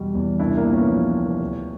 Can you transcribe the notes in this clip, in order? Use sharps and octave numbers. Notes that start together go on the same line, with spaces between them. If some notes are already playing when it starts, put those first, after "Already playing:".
Already playing: E2 B2 G3
E2
C2 D4 E4
A#3
A#2
B3 C#4
F3
C2
D2